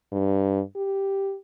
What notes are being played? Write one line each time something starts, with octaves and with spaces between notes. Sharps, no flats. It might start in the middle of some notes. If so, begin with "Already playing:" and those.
G2
G4